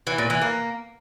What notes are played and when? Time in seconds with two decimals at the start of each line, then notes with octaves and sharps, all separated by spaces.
0.07 E3
0.18 A#2
0.30 E3
0.41 A#3